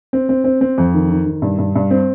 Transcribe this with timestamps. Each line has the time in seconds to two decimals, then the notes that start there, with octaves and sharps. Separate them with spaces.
0.13 C4
0.29 C4
0.44 C4
0.61 C4
0.78 F2
0.94 D#3
1.10 D#3
1.26 D#3
1.42 G2
1.58 G2
1.75 G2
1.91 C4